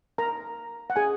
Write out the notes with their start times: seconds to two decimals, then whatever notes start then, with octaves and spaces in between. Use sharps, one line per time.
0.18 A#4 A#5
0.90 F#5
0.96 G#4 G#5